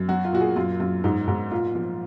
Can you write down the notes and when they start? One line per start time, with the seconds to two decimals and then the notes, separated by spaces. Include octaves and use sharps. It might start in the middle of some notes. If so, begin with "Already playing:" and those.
Already playing: F#2
0.08 F#3 F#4
0.25 F4
0.33 A#2 F#4
0.40 G#4
0.56 F#2 F4
0.80 F#2 F4
1.04 G#2 D#4
1.28 G#2
1.51 A#2 F4
1.75 F3